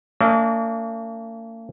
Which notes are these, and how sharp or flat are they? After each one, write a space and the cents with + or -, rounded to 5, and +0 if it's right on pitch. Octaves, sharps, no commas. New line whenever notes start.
A#3 -45 D4 -45 D#5 -20